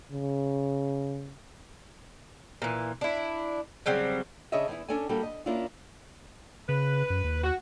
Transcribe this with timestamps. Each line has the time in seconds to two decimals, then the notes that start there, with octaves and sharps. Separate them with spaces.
0.12 C#3
2.62 A#2 E3
3.01 D4 E4
3.86 C#3 F#3 G3 C4
4.52 C#3 D4 G#4 C#5 D#5 E5
4.68 E2 E4
4.89 C#4 D4 A4 D5 G#5
5.09 G3 A#3 F#4 G4 A4
5.23 D#5
5.46 A#3 C#4 D4 E4 F4
6.69 C#3 B4
7.10 F#2
7.24 D#2
7.44 F#4